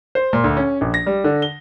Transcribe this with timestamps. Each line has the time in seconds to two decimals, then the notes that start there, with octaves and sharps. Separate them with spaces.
0.15 C5
0.33 A#2
0.44 D2
0.57 C#4
0.81 A#1
0.94 A#6
1.06 G3
1.24 D3
1.42 G7